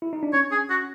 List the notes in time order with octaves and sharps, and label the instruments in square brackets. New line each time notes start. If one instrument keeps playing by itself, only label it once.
[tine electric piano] E4
D#4
D4
[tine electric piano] C#4 [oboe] C#5
[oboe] G#4
F#4